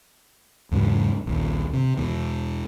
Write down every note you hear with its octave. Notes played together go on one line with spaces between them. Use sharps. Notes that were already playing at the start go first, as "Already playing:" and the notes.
E2 G#2 C#3 F#3
A#1 D#2
C3
E2 B2 E3